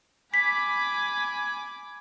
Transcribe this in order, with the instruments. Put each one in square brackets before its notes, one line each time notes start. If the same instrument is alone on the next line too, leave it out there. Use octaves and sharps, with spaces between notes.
[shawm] G#5 [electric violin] B5 D6 [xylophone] B6